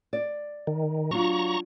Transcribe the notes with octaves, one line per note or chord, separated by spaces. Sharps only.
D5
D#3
F#3 D4 F4 A#5 C#6